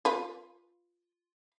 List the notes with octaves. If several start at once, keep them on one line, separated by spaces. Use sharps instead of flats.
F4 B4